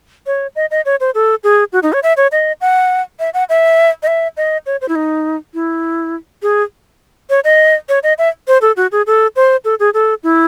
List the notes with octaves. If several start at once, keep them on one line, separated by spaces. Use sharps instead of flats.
C#5
D#5
D#5
C#5
C5
A4
G#4
F#4
D#4
C#5
E5
C#5
D#5
F#5
E5
F#5
E5
D#5
E5
D#5
C#5
C5
E4
D#4
E4
G#4
C#5
D#5
C#5
D#5
E5
C5
A4
F#4
G#4
A4
C5
A4
G#4
A4
E4